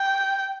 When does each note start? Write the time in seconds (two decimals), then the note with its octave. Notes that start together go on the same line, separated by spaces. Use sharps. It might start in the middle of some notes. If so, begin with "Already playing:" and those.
Already playing: G5